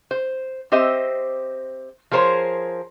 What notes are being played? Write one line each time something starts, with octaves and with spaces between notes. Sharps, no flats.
C5
C4 G4 C5 D#5 E5
F3 G#4 A#4 C5 C#5